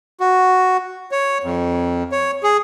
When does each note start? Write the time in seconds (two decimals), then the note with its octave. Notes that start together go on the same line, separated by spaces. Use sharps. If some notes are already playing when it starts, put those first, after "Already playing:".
0.20 F#4
1.11 C#5
1.44 F2
2.12 C#5
2.43 G#4